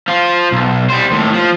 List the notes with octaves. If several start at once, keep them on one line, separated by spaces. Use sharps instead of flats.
F3 F4
B1
G3 C5
D#2 A2
F3